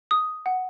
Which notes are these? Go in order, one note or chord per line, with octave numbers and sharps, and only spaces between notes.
D#6
F#5